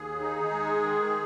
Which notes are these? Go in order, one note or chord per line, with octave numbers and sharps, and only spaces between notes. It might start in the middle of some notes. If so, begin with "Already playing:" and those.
Already playing: D#2 G#4
D#4
G#3
D#3